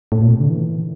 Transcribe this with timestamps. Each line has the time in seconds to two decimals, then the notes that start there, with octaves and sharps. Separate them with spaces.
0.12 A2
0.21 A#2
0.31 C3
0.40 D3
0.50 E3